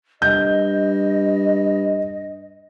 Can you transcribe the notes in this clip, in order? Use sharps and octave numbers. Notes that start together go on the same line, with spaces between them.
G2 D#5 G6